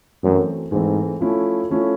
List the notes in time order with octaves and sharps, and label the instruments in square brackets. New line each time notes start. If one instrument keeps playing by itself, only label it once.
[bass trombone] F#2 [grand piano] E3 A3 C4
[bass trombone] G#2 [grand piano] E3 A3 C4
[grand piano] F3 A3 C#4 E4
F3 A3 C#4 E4